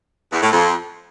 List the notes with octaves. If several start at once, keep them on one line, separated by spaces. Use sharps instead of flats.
E2
A2
F2